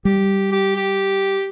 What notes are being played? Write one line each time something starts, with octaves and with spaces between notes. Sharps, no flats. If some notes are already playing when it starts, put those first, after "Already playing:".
G3 G4
G4
G4